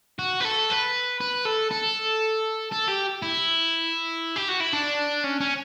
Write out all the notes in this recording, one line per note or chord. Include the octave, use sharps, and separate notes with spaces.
F#4
B4
A4
B4
B4
A4
A4
A4
G4
E4
G4
F#4
E4
D4
C#4
C#4